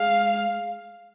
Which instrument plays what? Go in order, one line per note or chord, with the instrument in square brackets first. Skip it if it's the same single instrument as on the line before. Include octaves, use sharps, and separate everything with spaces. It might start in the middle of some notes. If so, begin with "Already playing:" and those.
Already playing: [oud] G#3 [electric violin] F5